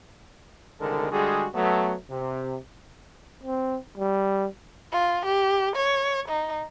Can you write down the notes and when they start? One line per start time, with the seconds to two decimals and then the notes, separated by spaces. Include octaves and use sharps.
0.80 C2 D3 D#3 G#3 A4 A#4
1.11 D3 G3 G#3 F#4 G#4
1.54 F#3 A3 B3
2.10 C3
3.44 C4
3.97 G3
4.92 F4
5.26 G4
5.76 C#5
6.29 D#4